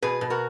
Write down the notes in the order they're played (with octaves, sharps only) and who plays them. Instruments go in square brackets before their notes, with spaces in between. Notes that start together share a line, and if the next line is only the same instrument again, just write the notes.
[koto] B2 [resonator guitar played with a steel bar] G#4 B4
[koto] B2
[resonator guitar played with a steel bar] F#4 A#4